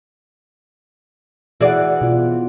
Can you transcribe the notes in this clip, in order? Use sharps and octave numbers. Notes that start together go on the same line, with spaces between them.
E3 F#4 G#4 D5 F#5
B2 F4